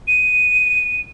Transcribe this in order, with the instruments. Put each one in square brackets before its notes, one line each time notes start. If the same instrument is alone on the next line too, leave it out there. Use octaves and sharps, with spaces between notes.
[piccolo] D#7